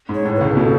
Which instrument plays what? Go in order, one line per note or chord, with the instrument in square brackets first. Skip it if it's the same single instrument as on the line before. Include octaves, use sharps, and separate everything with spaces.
[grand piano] G#2
[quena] C#5
[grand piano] A2
[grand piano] C#2 C#3 [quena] B4
[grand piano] B2 [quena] A4